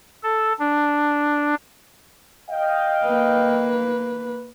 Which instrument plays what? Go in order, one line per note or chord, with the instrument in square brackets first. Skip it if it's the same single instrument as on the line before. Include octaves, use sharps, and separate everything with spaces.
[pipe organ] A4
D4
[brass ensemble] D#5 F5 G5
[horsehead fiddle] A#3 B4